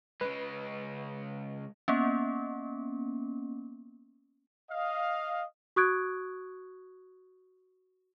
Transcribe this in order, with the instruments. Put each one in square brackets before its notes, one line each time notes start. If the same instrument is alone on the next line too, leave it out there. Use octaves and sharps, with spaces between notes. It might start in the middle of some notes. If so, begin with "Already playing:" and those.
[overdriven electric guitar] C#3 G#3 [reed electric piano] B4
[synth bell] A#3 B3 C#4
[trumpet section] D#5 F5
[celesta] F#4 C#6 D#6 F#6 G#6 D7